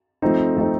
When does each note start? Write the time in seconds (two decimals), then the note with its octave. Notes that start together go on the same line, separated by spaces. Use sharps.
0.22 F3 A3 C4 D#4
0.57 F3 A3 C4 D#4